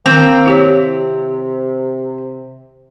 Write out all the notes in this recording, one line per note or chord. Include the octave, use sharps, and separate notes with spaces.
D#3 A#3 C4
C3 E4 G4 C#5